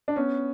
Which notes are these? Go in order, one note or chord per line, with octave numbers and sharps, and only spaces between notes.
D4
B3 C#4